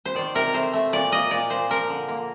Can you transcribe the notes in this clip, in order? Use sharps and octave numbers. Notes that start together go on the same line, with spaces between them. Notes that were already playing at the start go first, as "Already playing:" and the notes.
C5
D#3 D5
C3 A#4
A3 C5
A3
A#2 D5
A#3 D#5
A#2 D5
A#2 C5
F3 A#4
D3
A#3